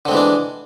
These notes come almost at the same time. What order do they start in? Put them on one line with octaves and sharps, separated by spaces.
D3 C4 G#3 E3 D4